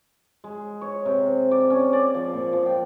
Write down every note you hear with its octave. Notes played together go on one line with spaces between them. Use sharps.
G#3
C#5
C3
D5
C#4
D5
F3
A#2
F3
G5